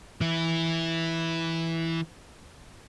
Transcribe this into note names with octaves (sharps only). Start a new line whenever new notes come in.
E3 E4